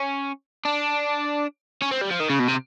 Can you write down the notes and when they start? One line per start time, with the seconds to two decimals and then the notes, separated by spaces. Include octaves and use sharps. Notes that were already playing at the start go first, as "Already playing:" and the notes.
Already playing: C#4
0.65 D4
1.82 C#4
1.91 C4
2.01 G3
2.11 F3
2.20 D#3
2.30 C#3
2.39 B2
2.48 C3